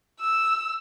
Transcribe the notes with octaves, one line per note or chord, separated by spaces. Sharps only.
E6